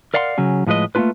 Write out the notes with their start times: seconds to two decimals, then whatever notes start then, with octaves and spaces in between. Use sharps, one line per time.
0.14 A#4 D5 F5 F#5 B5 C6
0.38 C#3 F#3 C#4
0.67 A2 F3 G#3 B4 D#5
0.95 A3 A#3 C#4 D4 F4 B4